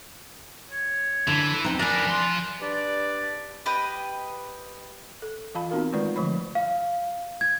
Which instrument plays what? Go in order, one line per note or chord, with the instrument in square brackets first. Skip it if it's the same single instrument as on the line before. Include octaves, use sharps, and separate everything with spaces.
[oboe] C#5
[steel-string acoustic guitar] D3 [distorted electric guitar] E3
[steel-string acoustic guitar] D2 C4 D#4
[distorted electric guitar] B3 A#4 [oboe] D4 [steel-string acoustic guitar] D5 G#5
[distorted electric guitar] F3 C6
[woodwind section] D4 G4 B4 D5
[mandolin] G4 B4 D#5 D#6
[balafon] A4
E3 F4 F5 A5 B5
B3 C4 D#4 F#4 A#4 F5
D#3 G#3 A3 F4 B4 D5
D3 F3 C#5 B5
[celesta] F5
G#6